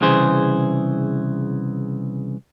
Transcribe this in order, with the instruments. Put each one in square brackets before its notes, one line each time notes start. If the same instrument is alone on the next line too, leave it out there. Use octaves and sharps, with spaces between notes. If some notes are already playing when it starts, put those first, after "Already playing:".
[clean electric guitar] C2 C#3 E3 G#4 C5